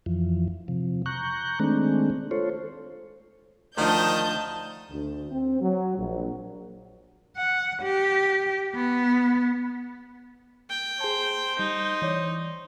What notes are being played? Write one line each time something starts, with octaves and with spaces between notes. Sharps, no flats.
F2 E3 F3
C3 F3
A#5 C#6 F#6 G6
D#3 G#3 A3 C4 D4
F4 A4 C5 C#5
D2 D#3 F3 D#5 A5 G6
D2
C4
F#3
A#1
F#5
G4
B3
G5
G#4 C5 A5
G3 D#4
E3 C#5 D5